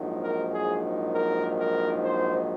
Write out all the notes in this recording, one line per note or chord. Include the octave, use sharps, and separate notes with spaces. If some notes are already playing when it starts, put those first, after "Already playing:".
Already playing: A#1 G#2 D#3 F#3
A#4
G#4
A#4
A#4
C5